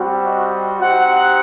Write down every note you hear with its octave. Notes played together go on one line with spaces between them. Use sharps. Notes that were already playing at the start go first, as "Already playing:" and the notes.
Already playing: G3 C4 F#4
D#5
C4 D#4 G4 F#5